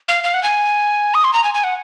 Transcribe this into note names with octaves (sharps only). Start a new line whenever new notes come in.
F5
F5
F#5
G#5
D#6
C6
A#5
G#5
G#5
F#5